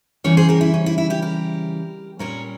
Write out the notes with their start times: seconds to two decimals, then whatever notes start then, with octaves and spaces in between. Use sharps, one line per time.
0.24 C#3 E3 G3 C#4 A#4 C#5
0.37 G#4 C5
0.49 G4 A#4
0.61 E4
0.74 C#4
0.86 E4
0.98 E4
1.10 E4 G4
1.22 G4 A#4
2.19 A#2 G3 C#4 A#4 C#5